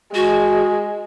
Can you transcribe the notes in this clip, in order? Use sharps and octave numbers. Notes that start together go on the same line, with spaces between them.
G#3 F#4